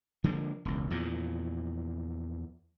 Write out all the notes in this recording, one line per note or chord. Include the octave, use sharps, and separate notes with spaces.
D3 F3 G#3 A#3
E1 C#2
E2 A#2 F3